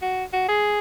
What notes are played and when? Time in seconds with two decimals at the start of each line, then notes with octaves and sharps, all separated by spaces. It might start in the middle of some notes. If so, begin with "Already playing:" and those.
0.02 F#4
0.33 F#4
0.49 G#4